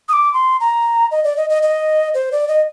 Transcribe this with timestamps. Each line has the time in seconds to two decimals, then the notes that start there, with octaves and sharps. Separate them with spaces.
0.09 D#6
0.13 D6
0.34 C6
0.60 A#5
1.11 D#5
1.24 D5
1.37 D#5
1.50 D#5
1.63 D#5
2.14 C5
2.32 D5
2.48 D#5